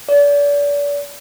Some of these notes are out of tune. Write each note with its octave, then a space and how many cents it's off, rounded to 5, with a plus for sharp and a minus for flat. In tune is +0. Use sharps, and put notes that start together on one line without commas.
D5 -35